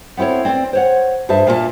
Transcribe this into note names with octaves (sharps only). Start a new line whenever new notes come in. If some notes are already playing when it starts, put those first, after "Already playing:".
B3 C4 E4 A4 C#5
C4 D5
C5 C#5 F#5
G2 G#4 C5 E5 A5
A#2 A#3 F4 C5 E5 A5